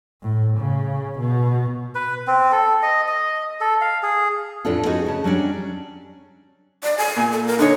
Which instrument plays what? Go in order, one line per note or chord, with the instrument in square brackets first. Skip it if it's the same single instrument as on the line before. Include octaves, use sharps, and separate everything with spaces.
[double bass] A2
C#3
B2
[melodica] B4
C4
A4
D#5
D#5
A4
F5
G#4
[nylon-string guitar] F2 A2 B3 D4 F4 A4
B3 C#4 D#4 F#4 G#4
C#3 A5
F#3 G3 C#4 D4
[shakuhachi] D5
G#5
[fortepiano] A#2
[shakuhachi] A4
A#4
[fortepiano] D3 C#5 [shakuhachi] D#4